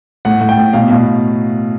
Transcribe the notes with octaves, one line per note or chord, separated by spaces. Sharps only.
A2 F#5
A2
G5
A2
B2 F5
B2 F5